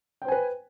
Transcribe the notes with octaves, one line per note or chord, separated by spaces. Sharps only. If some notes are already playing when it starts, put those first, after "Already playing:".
B4 C5 G5 G#5